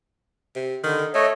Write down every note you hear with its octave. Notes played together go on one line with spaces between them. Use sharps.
C3
D3 D#3
A3 C#5 D#5